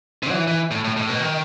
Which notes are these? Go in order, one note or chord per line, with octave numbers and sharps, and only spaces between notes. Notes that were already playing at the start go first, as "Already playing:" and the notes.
C3
F#3
E3
E3
A2
A2
A2
B2
D#3